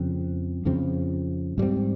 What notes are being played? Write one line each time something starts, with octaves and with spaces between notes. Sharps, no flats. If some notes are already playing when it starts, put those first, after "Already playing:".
Already playing: F2 C#3 F3 C4
F2 C#3 F3 C4
G#2 G3 C4